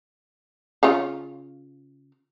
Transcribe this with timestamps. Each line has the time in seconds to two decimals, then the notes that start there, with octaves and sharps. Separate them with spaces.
0.83 C#3 C#4 F4